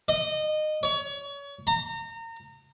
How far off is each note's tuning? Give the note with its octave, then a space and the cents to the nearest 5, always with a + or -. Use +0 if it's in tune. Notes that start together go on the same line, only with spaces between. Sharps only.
D#5 -20
C#5 +30
A#5 -30